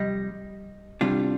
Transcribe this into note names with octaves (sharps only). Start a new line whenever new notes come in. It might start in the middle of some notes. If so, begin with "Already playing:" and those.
Already playing: F2 C3 G3 D#5
C2 C3 G3 D4 F4